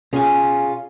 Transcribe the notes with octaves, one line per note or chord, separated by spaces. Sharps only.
B2 C#4 F4 G#4 G#5